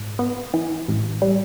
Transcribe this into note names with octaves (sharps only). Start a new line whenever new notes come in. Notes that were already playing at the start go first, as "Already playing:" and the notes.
Already playing: G#2
B3
E3
A1
G3